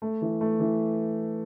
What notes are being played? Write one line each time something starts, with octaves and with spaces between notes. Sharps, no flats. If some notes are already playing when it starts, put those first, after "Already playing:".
A3
E3
A3
E3